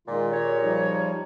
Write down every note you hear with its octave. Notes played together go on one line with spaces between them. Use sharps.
A#2 D#3 G#3 F4
G4 G#4 A#4 C#5
F3 G3 D#4